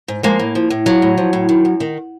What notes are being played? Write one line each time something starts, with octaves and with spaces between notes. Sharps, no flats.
G#2
F3 G#3 A#3
A2
F3
A2
F3 F#3
A2
F3
A2
D#3
F#2
D#3